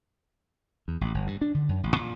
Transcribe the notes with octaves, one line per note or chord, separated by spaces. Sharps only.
E2
A1
G1
G2
D4
D3
F#2
A1
A#2